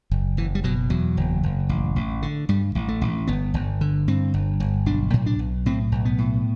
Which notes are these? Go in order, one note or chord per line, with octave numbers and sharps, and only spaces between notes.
F#1
F#1 E3
G3
B2 F#3
E2 F#3
F#1
F#1
A1
A1
D3
G2 G3
A1
A3
A1
G1 B3
G1
D3
G2 C4
G1
G1
B1 D4
A2
D4
B1
A2 C4
B1
B3
A2